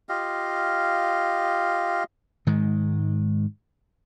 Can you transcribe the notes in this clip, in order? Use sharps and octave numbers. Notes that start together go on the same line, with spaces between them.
F4 G4 D#5 F5
G#2 D#3 G#3